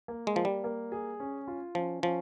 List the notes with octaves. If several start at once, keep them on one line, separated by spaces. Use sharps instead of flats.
A#3
G#3
F3 A#3
G3
A#3
G#4
C#4
F4
F3 C#4
F3 C#4